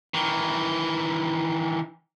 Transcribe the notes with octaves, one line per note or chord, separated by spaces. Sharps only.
D#3 E3